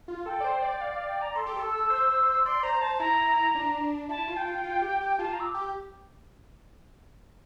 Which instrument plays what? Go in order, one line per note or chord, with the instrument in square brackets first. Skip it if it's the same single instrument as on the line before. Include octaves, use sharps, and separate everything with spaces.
[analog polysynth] F4
[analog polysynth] A4 [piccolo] G5
[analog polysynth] D5
C5
D5
[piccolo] F5
F5
G5
A#5
[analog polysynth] A4 [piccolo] C6
[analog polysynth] G4
A4
[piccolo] E6
[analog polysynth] C5
[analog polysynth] D5 [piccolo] C6
[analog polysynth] C5 [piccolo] A#5
[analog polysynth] C5 [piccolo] A5
[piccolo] A5
[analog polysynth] E4 [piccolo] A#5
[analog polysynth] D4
[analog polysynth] E4 [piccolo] A5
[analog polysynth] F4
[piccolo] G5
[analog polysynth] F4
F4
G4
G4
[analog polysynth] F4 [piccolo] A5
[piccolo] A#5
E6
D6
[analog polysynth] G4